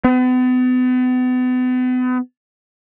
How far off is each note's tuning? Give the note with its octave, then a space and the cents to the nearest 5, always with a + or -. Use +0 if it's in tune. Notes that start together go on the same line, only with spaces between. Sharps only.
B3 +40